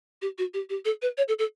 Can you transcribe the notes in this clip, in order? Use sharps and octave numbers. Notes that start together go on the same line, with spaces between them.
G4
F#4
G4
G4
A4
B4
C#5
A4
A4